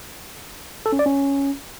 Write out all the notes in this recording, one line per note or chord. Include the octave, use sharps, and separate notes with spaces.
A4
C#4
D5
C#4